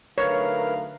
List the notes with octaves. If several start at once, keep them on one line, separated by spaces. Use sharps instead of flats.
D3 F#3 A3 D#4 A#4 B4 C#5 F5